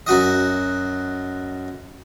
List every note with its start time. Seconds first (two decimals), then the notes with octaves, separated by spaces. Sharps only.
0.07 F#2 F#4 D#5